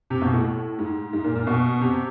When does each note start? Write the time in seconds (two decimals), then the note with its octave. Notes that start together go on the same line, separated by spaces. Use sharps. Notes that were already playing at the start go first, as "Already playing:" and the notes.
0.10 C3
0.21 B2
0.34 A2
0.79 G#2
1.13 G#2
1.24 A#2
1.35 A#2
1.47 B2
1.81 C3